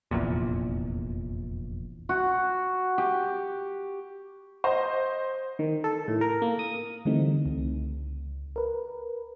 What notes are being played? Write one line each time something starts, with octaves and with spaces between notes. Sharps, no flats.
F1 A#1 E2 A#2
F#4
G4
C5 D#5
D#3
A4
A2
A#4
A#3
D#6
D3 E3 G3 A3 C4 D#4
C#2
A#4 B4